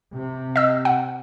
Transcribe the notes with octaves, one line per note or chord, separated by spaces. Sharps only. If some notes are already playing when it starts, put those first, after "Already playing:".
C3
D#5 E6
F#5